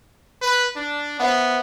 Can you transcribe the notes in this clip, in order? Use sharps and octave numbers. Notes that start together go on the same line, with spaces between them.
B4
D4
B3 C5 E5 F#5